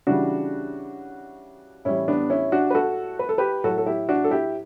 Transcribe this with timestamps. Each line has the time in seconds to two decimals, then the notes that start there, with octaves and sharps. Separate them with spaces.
0.07 C#3 E3 G3 D4 F#4
1.85 A2 E3 G3 C#4 E4
2.08 B3 D4
2.30 C#4 E4
2.52 D4 F#4
2.70 B4
2.74 F#4 A4
3.19 B4
3.29 A4
3.38 G4 B4
3.64 A2 F#3 F#4 A4
3.78 A4
3.86 E4 G4
4.09 D4 F#4
4.24 A4
4.31 E4 G4